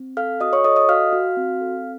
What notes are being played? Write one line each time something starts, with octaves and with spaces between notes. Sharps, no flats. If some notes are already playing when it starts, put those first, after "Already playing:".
Already playing: C4
A4 F5 F6
F#4 D#5 D#6
C#5 C#6
A4 D#5 D#6
D#5 D#6
F#4 F5 F6
F#4
C4
A4